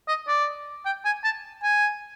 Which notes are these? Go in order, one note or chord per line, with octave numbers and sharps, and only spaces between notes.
D#5
D5
G5
G#5
A5
G#5